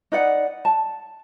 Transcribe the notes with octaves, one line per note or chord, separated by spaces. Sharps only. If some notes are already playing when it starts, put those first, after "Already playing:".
D#4 B4 D5 F#5
A5